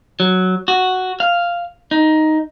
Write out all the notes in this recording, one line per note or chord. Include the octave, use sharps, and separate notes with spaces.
F#3
F#4
F5
D#4